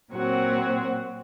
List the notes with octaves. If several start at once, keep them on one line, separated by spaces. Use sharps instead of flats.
A#2 F#3 C4 F#4